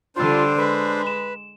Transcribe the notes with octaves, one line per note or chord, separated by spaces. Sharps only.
D3 G3 D4 F4 C5 C6 E6
G#3 B4
E7